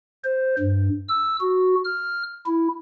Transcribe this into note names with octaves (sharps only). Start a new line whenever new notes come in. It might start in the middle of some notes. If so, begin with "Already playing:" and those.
C5
G2
E6
F#4
F6
E4